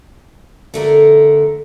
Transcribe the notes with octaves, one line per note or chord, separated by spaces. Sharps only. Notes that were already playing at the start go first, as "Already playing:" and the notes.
D3 A3 A#4